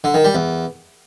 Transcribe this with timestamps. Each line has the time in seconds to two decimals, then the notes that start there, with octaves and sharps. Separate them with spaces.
0.04 D3
0.14 D#3
0.25 G3
0.35 E2